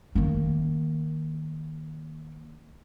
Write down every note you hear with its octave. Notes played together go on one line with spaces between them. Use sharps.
D#3 A#3